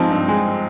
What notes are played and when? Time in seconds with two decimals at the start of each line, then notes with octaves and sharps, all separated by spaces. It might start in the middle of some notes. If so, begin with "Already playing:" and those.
Already playing: F3 G#3 C4 D#4
0.11 G2
0.28 G#3